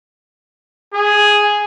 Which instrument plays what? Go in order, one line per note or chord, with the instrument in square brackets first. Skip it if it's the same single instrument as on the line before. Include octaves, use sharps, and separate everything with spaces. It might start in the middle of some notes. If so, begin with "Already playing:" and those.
[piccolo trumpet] G#4